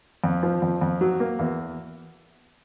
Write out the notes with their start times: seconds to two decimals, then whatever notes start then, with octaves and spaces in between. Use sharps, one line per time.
0.24 F2
0.43 F3
0.62 F2
0.81 F2
1.01 F#3
1.20 A#3
1.39 E2